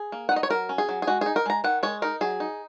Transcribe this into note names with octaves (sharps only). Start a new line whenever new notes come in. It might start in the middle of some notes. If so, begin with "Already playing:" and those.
Already playing: G#4
A#3
F#5
D#4 D#5
C#5
F#3 A#4
C#4
G#4
F#3
G#4
G#3 F#4
D#4 G#4
A#4
G#3 A#5
D#3 F#5
G#3 C#5
D#4 A#4
F#3 G#4
D#4